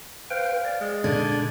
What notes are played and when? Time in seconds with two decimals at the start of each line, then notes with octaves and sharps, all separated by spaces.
0.30 B4 C5 F5 G5
0.65 D5
0.81 G#3
1.04 A#2 D3 D5 G#6